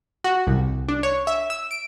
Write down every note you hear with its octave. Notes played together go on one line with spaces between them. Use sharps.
F#4
C2
D4
C#5
E5
E6
D7